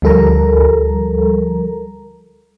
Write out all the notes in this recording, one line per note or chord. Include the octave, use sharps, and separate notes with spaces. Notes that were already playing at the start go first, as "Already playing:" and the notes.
D2 F3 G3 A4 A#4 A#5